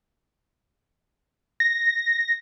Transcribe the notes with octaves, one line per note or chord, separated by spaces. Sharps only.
A#6